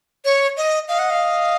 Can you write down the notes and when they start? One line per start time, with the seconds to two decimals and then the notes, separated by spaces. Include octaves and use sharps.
0.25 C#5
0.57 D#5
0.88 D#5 F5
0.99 F#5
1.10 F5